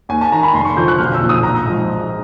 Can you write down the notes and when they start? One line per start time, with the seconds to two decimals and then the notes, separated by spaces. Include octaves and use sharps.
0.09 D#2 G#5
0.21 A5
0.32 D#3 A#5
0.43 B5
0.54 F1 C6
0.65 C#6
0.76 F2 D3 F3 G6
0.88 F#6
0.98 B1 F6
1.14 E6
1.21 A#2 F3
1.29 D#6
1.43 A#1 A#5
1.65 G#2 F3